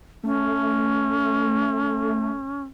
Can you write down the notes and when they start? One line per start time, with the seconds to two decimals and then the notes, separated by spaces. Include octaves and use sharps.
0.24 A3 C#4